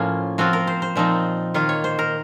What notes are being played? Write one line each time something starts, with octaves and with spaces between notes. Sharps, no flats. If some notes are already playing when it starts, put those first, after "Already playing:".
Already playing: A2 F3 A#3 C#4 F4
F3 C4 F4 F#4
A#4
C5
C5
A#2 F3 C4 D#4
D#3 A#3 F4
C#5
C5
A#4